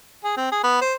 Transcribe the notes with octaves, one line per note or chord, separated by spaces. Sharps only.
G#4
C4
G#4
B3
C5